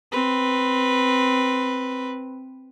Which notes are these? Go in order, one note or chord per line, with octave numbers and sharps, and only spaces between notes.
C4 B4